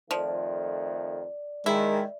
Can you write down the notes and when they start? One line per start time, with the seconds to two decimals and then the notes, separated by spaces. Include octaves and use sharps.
0.11 F2 D#3 F3 A3 D5
1.66 D#3 G#3 E4